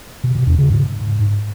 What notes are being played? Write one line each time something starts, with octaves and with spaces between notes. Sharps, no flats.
B2
B2
E2
C#3
G#2